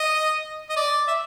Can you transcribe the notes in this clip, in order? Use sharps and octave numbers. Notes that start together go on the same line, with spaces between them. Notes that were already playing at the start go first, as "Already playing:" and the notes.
Already playing: D#5
D#5
D5
E5